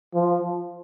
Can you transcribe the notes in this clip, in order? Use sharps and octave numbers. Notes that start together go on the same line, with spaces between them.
F3